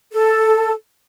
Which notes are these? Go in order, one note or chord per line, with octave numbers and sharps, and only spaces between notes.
A4